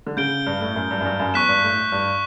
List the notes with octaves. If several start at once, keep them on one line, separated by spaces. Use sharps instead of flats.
D3
C#3 G6 D7 G7
G2
A2
F#2
G2
F#2
G2
F#2
E2 C#6 F#6 B6 E7
G2
A2
G2